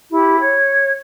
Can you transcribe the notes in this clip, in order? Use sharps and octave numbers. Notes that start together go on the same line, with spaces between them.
E4 G4
C#5